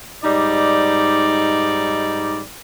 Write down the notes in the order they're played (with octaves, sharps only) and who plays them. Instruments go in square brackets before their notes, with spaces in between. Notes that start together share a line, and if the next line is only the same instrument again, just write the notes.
[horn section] G#2 G3 D#4 D5